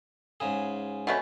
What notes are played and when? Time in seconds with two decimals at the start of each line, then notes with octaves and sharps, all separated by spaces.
0.40 G#2 C#3 G#4
1.07 B2 A3 C#4